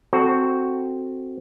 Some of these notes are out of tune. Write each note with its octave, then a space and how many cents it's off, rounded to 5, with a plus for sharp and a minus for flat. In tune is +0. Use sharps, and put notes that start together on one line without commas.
C4 +0 F#4 +0 A4 +0